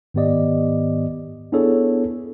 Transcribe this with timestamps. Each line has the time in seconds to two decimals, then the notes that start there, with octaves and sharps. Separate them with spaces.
0.14 G#2 D#3 B3 G4 D5 D#5
1.52 B3 D4 E4 G#4 A4 C#5